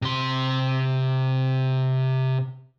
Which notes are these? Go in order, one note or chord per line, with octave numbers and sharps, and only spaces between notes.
C3 C6